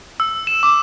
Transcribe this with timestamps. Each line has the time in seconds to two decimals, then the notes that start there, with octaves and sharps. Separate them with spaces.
0.20 E6
0.47 E7
0.63 D6